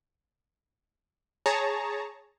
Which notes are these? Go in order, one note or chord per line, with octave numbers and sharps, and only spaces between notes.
G#4 C#5 A5 A#5